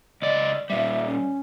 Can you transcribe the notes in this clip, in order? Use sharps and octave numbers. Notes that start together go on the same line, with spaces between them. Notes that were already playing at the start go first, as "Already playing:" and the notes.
C#2 D5 D#5
A#2 G3 E5
C#4